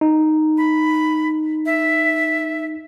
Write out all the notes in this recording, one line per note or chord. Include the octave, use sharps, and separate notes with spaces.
D#4
B5
E5